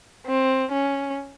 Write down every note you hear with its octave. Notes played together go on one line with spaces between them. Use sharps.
C4
C#4